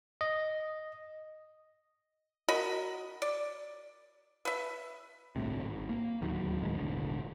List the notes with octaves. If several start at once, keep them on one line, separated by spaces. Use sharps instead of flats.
D#5
F#4 A#4 D#5 B5
D5
B4 E5
G1 C2 A2 C3
G#1
A#3
D1 D#2 F#3
C#2 A2 D#3 G#3
E1 A1 D3